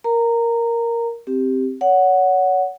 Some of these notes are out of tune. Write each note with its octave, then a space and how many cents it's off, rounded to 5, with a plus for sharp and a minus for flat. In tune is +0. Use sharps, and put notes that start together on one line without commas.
A#4 +0 A#5 -15
C4 +0 G4 +0
C#5 +30 F#5 +0